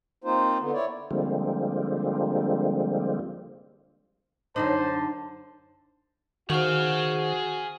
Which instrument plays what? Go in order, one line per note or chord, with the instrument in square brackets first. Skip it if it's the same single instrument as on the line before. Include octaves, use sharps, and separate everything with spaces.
[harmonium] A#3 C4 D#4 F4 C5
D3 B3
E4 C#5 D5
[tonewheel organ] D3 F3 G3 G#3 A#3 C4
[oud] F#2 D3 D#4 [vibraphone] D4 [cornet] C5 [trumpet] A5
[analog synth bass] D#3 [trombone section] F#4 [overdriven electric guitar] G#4 F5 [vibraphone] C5 C#6